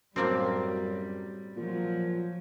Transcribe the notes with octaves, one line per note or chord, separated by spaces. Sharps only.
F#2 A2 G3 A#3 C4
A#2 F3 F#3